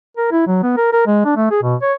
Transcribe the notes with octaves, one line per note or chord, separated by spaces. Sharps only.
A#4
E4
F#3
B3
A#4
A#4
G#3
D4
A3
G#4
B2
C#5